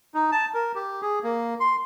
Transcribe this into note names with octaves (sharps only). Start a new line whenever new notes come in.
D#4
A5
A#4
G4
G#4
A#3
C6